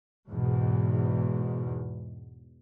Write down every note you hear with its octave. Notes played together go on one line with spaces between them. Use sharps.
E2 G#2 B2